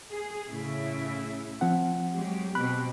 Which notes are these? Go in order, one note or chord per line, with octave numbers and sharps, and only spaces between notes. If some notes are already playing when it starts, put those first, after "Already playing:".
G#4
A2 C#3 E4
F3 C4 F#5
F#3 G#3 G4
B2 C4 G4 B5 F#6